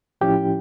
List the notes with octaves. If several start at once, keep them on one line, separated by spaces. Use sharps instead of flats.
A2 F3 C#4 E4 G4 G5